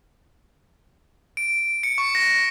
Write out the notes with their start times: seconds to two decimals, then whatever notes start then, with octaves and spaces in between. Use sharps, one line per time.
1.37 D7
1.83 C#7
1.98 C#6
2.15 A#6